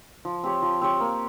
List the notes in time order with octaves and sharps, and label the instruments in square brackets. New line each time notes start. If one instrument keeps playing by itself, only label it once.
[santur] F3
C4 G4 C#5
F3
C4 G4 C#5
A#3